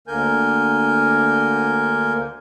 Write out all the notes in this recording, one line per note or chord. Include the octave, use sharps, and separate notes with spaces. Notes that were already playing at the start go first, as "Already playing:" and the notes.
D2 D3 A#3 A#4 G#5 G6